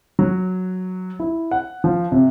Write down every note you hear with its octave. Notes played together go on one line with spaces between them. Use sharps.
F#3
E4
F#5
F3
C3